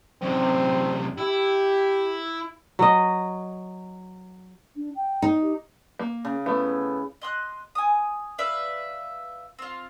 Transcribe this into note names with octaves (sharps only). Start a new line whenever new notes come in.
F#2 C3 C4
E4 G4
F#3 D#5
D4
G5
D#4
G4
A#3
C#3
A3 B3 E4
D#5 C6 F#6
G#5 D#6
B4 D5 E5 F5
C4 F4